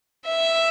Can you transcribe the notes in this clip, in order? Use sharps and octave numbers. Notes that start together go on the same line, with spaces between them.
E5